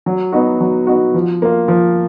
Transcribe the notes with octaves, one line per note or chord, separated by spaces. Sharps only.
F#3
B3 D#4 F#4
F#3
B3 D#4 F#4
F3
A#3 F4
F3